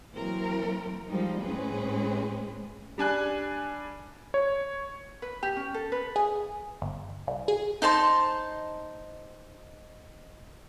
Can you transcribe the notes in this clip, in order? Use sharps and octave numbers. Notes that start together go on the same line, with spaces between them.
E3 F#3 A#3 C4 A#4
F3 G3 G#3 D#4
A2 G#3 C4 C#4 G#4 B4
G3 D4 G#5 F#6
C#5
B4
G4
C#4
A4
B4
G#4
G1
C2
G#4
D#4 C5 A5 C6